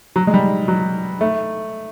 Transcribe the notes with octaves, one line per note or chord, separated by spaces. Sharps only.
F#3
G#3
G3
F#3
A3